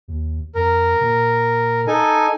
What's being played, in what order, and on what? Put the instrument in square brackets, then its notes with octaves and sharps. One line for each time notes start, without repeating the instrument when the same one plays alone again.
[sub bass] D#2
[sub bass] F2 [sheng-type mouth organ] A#4
[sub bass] A#2
[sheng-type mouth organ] D#4 A4 G#5